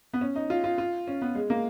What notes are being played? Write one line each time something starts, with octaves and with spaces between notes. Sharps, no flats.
B3
C#4
D#4
F4
F4
F4
C#4
B3
G#3
A#3